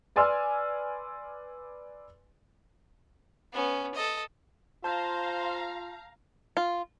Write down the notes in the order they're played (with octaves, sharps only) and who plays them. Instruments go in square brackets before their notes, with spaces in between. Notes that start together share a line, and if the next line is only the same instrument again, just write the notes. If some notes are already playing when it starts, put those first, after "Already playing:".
[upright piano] B4 D5 G#5 C6 E6 F6
[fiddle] B3 C#4
A4 D#5
[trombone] F4 [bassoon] C5 [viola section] F5 A#5 [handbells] A5 G6
[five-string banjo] F4